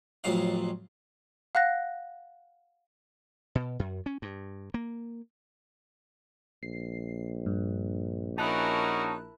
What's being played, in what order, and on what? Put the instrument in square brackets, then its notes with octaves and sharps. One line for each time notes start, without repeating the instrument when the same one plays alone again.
[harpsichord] A1 F2 F#3 F5
[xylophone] F5 F#5 F#6 A#6
[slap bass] B2
F#2
C#4
G2
A#3
[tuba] A#1 [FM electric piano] C7
[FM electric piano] G2
[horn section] C#4 D#4 F#4 [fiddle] E4 A#4 [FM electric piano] A5 F#6